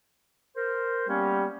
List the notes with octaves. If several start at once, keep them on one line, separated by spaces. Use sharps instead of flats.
A#4 C5
G3 A#3 B3 C#4